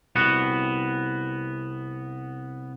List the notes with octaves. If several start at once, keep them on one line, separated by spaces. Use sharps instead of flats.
C2 B3 F#4